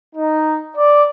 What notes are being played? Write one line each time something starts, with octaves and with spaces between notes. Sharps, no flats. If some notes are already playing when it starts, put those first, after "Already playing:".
D#4
D5